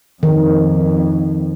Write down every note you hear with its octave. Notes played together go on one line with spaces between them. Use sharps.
F2 D#3